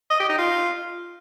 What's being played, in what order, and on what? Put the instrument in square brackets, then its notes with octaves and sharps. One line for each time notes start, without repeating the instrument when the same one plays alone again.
[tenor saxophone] D#5
G4
D#4
F4